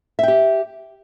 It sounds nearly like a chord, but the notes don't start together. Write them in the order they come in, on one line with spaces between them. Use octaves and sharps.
E5 G5 G4